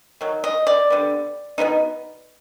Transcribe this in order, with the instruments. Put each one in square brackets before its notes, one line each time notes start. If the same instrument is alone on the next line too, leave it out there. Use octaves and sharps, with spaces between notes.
[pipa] D#3 F#3
D#5
D5
D3 G3 B3
B2 G#3 B3 D#4